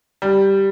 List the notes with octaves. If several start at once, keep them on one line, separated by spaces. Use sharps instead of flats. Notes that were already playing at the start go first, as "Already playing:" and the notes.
G3